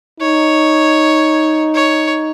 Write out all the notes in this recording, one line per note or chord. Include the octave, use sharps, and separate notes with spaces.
D#4 C#5
C#5